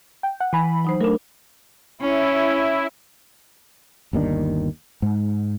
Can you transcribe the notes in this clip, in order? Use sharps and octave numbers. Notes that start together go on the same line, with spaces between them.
G5
F#5
E3 G#5 B5
F#3 D#4 C5
A3 D4 A#4
C#4 E4
G1 D#2 D#3 D4
G#2